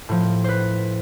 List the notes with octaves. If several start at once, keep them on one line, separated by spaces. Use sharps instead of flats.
A2 F3
B4 C5